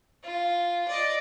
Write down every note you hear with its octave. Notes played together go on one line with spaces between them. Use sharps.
F4
D5 D#5